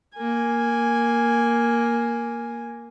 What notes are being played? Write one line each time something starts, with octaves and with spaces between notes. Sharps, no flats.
A#3 G#5